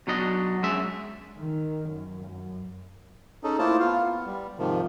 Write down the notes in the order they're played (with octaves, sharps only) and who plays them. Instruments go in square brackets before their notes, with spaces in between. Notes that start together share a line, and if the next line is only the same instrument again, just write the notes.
[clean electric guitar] B2 F#3 D4 D#5
F#2 G#3 E5
[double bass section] D#3
F#2
F#2
[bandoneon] C#4 D#4 G#4 A4
A3 A#3 E4 F4 C5 A5
B3 F4 F5
B3
G3
G#2 C3 D#3 F3